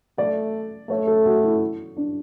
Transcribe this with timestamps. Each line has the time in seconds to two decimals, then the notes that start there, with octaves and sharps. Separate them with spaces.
0.18 A3 D5
0.89 A3 C#5
1.07 A4
1.26 F#4
1.43 E4
1.97 D4